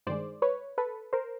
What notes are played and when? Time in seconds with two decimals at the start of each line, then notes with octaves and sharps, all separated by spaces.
0.07 G2 D#3 G#3 C5 D5
0.42 B4 C#5
0.78 A4 B4
1.13 A#4 C5